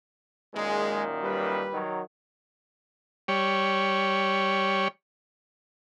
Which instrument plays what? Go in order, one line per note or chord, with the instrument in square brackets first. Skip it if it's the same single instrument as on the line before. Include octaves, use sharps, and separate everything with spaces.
[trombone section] F#2 A#2 D#3 [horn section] G#3
[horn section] G3 B4
[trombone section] D#3 F#3
[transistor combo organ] G3 C#5